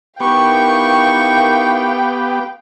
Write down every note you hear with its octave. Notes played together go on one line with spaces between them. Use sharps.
B3 D#4 E4 G4 A#4 F5 G5 C#6